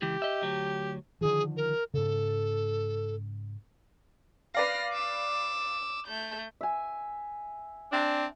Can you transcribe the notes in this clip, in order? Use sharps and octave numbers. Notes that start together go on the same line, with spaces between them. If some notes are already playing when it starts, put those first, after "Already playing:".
C#2 E3 G4
D#5 E5
D2 F#3
D3 D#3 F3 G#4
A#4
G#2 C#3 A4
B4 D5 F5 F6 A#6
D6 E6
A3 G6
E5 G#5
C4 D4